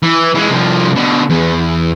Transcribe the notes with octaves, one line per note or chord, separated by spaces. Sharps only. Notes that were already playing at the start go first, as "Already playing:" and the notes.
E3
E3 G#3
C2 F3
B2 D3
E2